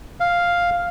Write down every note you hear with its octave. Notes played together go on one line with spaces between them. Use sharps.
F5